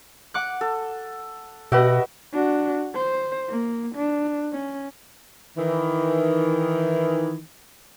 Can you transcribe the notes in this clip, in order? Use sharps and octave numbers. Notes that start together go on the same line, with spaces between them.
F#5 D6 F#6
A4
B2 F#4 G4 B4 D#5 E5
D4 F#4
C5
A#3
D4
C#4
D#3 E3